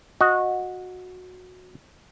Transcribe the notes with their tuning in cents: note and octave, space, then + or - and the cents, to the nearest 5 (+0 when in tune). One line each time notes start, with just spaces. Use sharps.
F#4 -15 D#5 +0